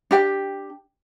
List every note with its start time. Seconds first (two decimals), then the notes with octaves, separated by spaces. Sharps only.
0.11 D4 G4 G5